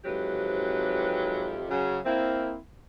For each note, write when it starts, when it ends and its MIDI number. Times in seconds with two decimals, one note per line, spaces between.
0.05 1.63 41
0.05 1.63 44
0.05 1.63 48
0.05 1.63 54
0.05 1.63 67
0.05 1.63 71
1.70 1.98 49
1.70 1.98 54
2.05 2.55 58
2.05 2.55 60
2.05 2.55 64